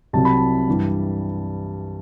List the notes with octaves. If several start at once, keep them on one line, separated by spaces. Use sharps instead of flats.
C2 C3 F#3 A5
B5
A5
G2 E3 G3